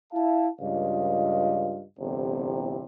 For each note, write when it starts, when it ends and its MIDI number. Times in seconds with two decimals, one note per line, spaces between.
0.13 0.48 64
0.13 0.48 77
0.13 0.48 81
0.60 1.82 37
0.60 1.82 43
0.60 1.82 65
0.60 1.82 75
0.60 1.82 77
1.99 2.86 31
1.99 2.86 40
1.99 2.86 45
1.99 2.86 48